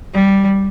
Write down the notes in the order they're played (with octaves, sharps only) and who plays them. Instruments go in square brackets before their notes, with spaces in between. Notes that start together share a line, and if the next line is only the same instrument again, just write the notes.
[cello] G3